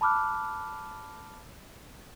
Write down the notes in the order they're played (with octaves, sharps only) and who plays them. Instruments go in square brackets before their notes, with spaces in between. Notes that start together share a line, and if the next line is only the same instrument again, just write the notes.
[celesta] A5 B5 D6 F6 F#6